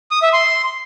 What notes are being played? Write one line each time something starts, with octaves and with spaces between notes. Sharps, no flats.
D#6
E5
C6